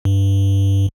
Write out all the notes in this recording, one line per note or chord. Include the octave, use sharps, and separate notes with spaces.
G2